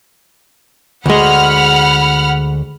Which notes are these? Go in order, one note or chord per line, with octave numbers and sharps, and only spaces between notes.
D2 G#3 F#5 B5 F6